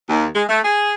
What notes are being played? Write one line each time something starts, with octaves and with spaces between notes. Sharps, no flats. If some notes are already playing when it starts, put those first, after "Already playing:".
D#2
G#3
A3
G#4